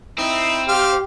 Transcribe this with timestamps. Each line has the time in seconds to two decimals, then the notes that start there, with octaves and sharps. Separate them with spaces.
0.18 C4 D#4 E4
0.69 G4 F5 C6 F6